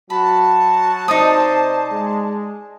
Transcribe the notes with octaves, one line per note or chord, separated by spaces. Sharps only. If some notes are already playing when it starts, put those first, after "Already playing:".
F#3 F#4 A5 B5
C3 D#4 C5 D5 D#6
G#3